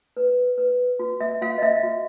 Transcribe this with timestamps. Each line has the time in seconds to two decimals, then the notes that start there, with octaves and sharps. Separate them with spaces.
0.17 B4
0.58 B4
0.99 F#4
1.21 E5
1.42 F#4 F5
1.58 D#5
1.62 E5
1.83 F#4